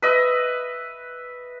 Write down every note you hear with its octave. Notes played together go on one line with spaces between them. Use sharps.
B4 D#5 E5